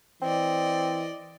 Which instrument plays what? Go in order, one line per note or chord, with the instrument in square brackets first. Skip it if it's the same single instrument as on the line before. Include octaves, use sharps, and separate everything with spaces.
[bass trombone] E3 [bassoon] C4 [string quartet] D5 D#5